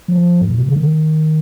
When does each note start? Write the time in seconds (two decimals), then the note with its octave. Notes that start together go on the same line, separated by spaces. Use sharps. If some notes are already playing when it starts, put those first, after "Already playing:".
0.08 F3
0.41 G#2
0.50 A#2
0.59 C3
0.69 D3
0.76 D#3